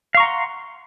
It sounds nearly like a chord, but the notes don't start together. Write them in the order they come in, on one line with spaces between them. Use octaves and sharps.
F5 C#6 A#5 F#5 C6